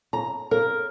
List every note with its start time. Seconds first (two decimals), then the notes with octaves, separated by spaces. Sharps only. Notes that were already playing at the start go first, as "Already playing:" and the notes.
0.13 A#5
0.51 A#4